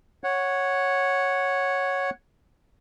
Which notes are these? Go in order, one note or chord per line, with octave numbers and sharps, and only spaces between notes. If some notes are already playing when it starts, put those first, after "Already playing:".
C#5 F#5